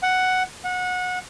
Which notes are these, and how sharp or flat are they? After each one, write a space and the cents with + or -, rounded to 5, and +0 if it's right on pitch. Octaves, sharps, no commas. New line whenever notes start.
F#5 +5
F#5 -25